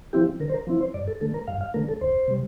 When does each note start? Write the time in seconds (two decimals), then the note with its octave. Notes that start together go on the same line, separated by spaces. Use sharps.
0.13 F3 C4 E4 G4
0.40 D3 A#4
0.50 C5
0.54 A#4
0.67 F3 C4 E4
0.80 C5
0.94 G2 D5
1.08 A4
1.21 D3 A3 A4
1.34 A#4
1.48 G2 F5
1.61 F5
1.74 D3 A3 A#4
1.89 A4
2.01 D2 C5
2.28 C3 G3